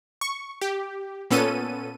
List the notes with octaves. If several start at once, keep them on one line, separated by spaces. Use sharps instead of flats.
C#6
G4
A#2 B3 C#4 A4 D#7